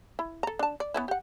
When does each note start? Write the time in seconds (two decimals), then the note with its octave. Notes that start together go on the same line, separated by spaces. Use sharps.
0.19 E4
0.43 A4 A#5
0.59 D4 A5
0.80 D5
0.94 B3 C#4 E4
1.08 G4 F#5